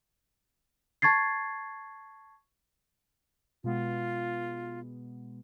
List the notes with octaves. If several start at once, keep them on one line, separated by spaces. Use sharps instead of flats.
A5 C#6 G#6 A6 C7
B2 G#3 B3 F4